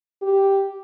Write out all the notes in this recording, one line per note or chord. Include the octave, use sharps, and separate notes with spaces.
G4